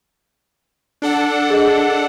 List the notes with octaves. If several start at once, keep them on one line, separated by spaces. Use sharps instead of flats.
D4 A4 F#5
G#4 D#5